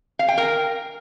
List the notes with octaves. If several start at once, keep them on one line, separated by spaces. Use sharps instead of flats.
F5
G5
A#4